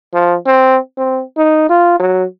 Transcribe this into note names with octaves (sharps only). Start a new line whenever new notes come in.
F3
C4
C4
D#4
F4
F#3